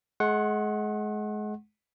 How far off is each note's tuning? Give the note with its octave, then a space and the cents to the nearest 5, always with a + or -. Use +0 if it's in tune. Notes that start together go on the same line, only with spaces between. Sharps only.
G#3 +30 F#5 +0 C6 +45